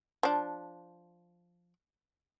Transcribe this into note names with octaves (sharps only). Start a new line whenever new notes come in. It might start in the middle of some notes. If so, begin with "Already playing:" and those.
F3 D4